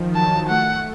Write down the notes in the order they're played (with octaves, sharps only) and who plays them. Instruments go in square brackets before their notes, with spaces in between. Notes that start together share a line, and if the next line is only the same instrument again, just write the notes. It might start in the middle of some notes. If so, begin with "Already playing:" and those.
Already playing: [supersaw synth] D#3 F3
[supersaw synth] F#3 [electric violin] A5
[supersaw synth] A3 [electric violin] F#5